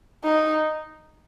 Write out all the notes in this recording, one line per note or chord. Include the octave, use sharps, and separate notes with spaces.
D#4